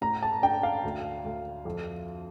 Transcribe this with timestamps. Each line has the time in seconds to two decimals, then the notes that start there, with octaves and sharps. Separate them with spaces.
0.01 A2 A#5
0.22 A5
0.42 D4 G5
0.63 F5
0.84 D2
1.24 D2
1.65 F2